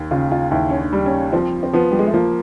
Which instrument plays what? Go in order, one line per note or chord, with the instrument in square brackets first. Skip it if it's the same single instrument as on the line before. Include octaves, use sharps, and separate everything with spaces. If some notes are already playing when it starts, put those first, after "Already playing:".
Already playing: [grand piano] D#2
[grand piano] C#3 [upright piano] F4
[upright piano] F4
[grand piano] D#2 [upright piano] E4
[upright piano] C#4
D4
[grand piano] G3
[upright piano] C#4
[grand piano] F3 [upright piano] C4
[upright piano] C4
[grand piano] F3 [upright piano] B3
[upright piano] G3
G#3
A3
[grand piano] F3 [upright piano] A#3